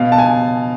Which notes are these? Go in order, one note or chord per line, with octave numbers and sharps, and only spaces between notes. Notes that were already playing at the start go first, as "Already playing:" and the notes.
Already playing: B2 F5
A5
G#5